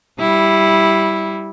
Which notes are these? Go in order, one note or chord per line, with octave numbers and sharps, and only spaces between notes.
G3 E4